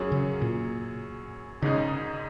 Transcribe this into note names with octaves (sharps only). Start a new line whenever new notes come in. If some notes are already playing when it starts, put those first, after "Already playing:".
Already playing: F#2 F#3 C#4 G#4
C#3
A#2
G#1 G#2 C#3 G#3 D#4